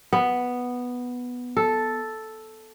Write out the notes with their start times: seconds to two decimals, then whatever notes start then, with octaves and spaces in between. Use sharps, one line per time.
0.13 B3
1.57 A4